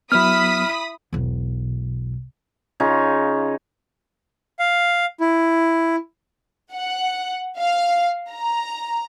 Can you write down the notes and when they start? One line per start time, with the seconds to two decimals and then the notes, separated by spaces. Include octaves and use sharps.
0.12 F#3 B3 E4 B5 D#6 F6 B6
1.13 E1 B1
2.80 C#3 D#4 F4 C#5
4.59 F5
5.21 E4
6.73 F#5
7.59 F5
8.30 A#5